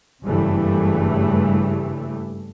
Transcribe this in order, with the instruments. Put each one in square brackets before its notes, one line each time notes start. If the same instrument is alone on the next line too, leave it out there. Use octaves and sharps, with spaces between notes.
[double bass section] F#1 G2 C#3 E3 G3 A3